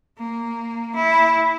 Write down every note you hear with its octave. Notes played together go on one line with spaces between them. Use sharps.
A#3
E4